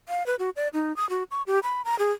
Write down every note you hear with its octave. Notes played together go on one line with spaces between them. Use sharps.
F5
B4
F#4
D5
D#4
D#6
F#4
C#6
G4
B5
A#5
G#4